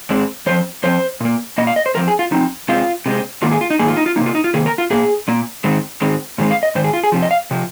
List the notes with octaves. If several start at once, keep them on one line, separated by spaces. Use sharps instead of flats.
G#2 G#3 C4
F2 F3 C4 C5
F2 F3 C4 C5
A#2 A#3
A#2 A#3 D#5
F5
D#5
C5
F2 F3 C4 A#4
G#4
F4
F2 F3 C4 D#4
C3 G#3 C4 F4
C3 G#3 C4
G#2 D#3 A#3 F4
G#4
F4
D#4
G#2 D#3 A#3 G#4
F4
D#4
F4
C3 D#3 A#3 D#4
F4
D#4
F4
C3 D#3 A#3 G#4
A#4
F4
A#2 A#3 G#4
A#2 A#3
G#2 D#3 G#3 C4
G#2 D#3 G#3 C4
G#2 D#3 G#3 C4
F5
D#5
G#2 D#3 C5
G#4
F4
G#4
F2 C3 F3
D#5
F5
C3 F3